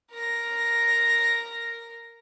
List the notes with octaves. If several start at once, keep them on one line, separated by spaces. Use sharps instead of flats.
A#4 A#6